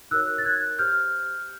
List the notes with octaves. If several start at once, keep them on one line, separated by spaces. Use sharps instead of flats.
D#4 F#4 A#4 C#5 E6 F#6
A6
F#6 G#6
G4 C5 F6 G6